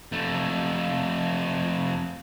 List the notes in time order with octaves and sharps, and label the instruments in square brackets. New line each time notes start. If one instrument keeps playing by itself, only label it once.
[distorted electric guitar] F2 A3